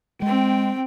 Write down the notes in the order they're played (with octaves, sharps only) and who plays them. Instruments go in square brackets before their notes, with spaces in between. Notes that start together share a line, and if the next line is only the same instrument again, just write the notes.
[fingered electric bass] G#3 [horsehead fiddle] C4 G5